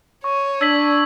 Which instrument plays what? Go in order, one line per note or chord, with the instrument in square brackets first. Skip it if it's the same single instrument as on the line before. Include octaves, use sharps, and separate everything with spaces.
[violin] C#5 [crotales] C#6
[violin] D4 [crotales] E6 G#6 B6 F#7